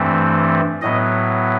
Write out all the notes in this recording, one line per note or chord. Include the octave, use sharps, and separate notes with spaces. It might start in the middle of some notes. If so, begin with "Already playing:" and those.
Already playing: G2 E3 A3 C4
A2 F#3 B3 D#5